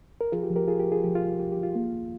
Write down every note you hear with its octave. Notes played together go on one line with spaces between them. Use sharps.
A#4
F3 F4 G#4
G4
F3
G4 A#4
C2 F4 G#4
G4
C2
F4 G#4
F3 G4
F4
C2
C2 G4
G4
C2
F4
A#3
D#2